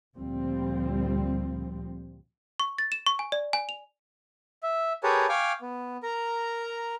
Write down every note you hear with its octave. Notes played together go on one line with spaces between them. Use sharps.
D2 A#2 F3 G3 C4
C#6
A6
E7
C#6
G#5
D5
G#5
F7
E5
G4 G#4 A#4 B4 C#5 A5
F5 G5 G#5 C#6 D6
B3
A#4 A#5